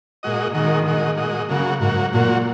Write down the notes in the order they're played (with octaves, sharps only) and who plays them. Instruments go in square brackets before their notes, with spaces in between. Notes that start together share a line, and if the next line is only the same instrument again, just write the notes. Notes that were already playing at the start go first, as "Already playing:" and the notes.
[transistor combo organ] A#2 G#3 F#4 D#5
[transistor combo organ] A#2 G#3 F#4 D#5 [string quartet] D#3
[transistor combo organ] A#2 G#3 F#4 D#5
A#2 G#3 F#4 D#5
[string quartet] C#3 [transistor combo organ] F#3 A#3 F#4
[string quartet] G#2 [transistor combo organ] F#3 A#3 F#4
[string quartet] A#2 [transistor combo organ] F#3 A#3 F#4